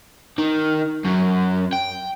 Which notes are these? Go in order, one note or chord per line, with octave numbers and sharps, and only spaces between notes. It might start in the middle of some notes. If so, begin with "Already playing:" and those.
D#3
F#2
G5